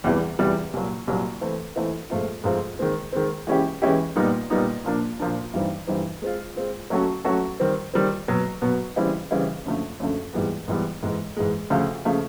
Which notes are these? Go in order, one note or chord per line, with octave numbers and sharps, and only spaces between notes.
E2 C3 E3 G3
E2 C3 E3 G3
C2 A#2 F#3
C2 A#2 F#3
E3 A3 C4 E4
E3 A3 C4 E4
G#2 F3 A3 C4 F4
G#2 F3 A3 C4 F4
D#3 G#3 C4
D#3 G#3 C4
E3 G#3 C#4 E4 G4
E3 G#3 C#4 E4 G4
A#2 G3 B3 D#4
A#2 G3 B3 D#4
A#2 F3 A#3 D4
A#2 F3 A#3 D4
G2 E3 G3 C4 D#4
G2 E3 G3 C4 D#4
G#3 C4 F4
G#3 C4 F4
F#3 A3 C#4 F#4 A4
F#3 A3 C#4 F#4 A4
D#3 G3 C4
D#3 G3 C4
B2 F#3 B3
B2 F#3 B3
C#3 E3 G3 C4 E4
C#3 E3 G3 C4 E4
F#2 D3 F3 A3
F#2 D3 F3 A3
G#2 E3 G3 B3
G#2 E3 G3 B3
G#2 E3 G#3
G#2 E3 G#3
D2 C#3 F3 A3
C#3 F3 A3